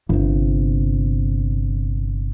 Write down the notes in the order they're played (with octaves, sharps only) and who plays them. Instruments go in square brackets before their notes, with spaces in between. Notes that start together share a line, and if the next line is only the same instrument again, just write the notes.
[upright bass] G1 C3